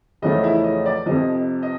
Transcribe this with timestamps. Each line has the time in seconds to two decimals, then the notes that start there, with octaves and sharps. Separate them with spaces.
0.22 E2 C#3 F3 A3 C#4 D#5
0.44 E4 E5
0.64 D#5
0.86 D5
1.06 F2 C3 F3 D#5
1.63 D#5